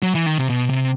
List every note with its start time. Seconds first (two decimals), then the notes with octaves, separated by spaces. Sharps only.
0.03 F#3
0.15 E3
0.26 D#3
0.38 C3
0.50 B2
0.69 C3